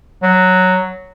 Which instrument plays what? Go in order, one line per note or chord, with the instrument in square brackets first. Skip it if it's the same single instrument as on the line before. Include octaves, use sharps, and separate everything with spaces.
[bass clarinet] F#3